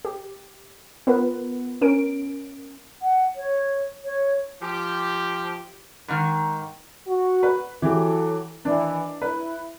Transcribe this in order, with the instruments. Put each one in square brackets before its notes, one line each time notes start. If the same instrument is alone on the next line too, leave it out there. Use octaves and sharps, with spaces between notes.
[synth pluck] G4
B3 F4 A#4 B4
C#4 A#4 D7
[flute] F#5
C#5
C#5
[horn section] F3 G4
[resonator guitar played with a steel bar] G#2 D#3
[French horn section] F#4
[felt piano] B4
[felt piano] E3 G4 [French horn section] F#3 A4
[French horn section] D#3 E3 [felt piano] D4
[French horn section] E4 [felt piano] B4